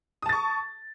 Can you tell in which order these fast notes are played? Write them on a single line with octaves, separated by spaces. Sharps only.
D#6 A5 A6 C#6